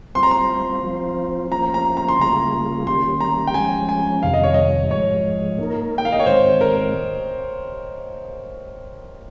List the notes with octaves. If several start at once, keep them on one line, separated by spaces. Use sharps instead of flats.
G3 C4 F4 C5 C6
A#5
C6
F3 C4 F4 C5
F3 A#3 C#4 F4 C5 A#5
A#5
A#5
C6
C#3 G3 A#3 F4 G#4 A#5
D#3 G3 A#3 C#4 G4 C6
A#5
G5
F3 G#3 C#4 G#5
G#5
F2 C3 D#3 G3 F5
D#5
C#5
D#5
G#2 F3 G#3 C#5
A#3 D#4 A#4
G5
F5
D#5
C#5
G#2 D#3 G#3 C4 C5
A#4